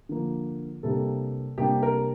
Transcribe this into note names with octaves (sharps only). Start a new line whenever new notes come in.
D3 F3 A#3
C3 G3 A#3 D4 A4
C3 G3 A#3 D4 G4
A#4